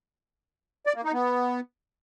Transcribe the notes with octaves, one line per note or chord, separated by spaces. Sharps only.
D5
A#3
D#4
B3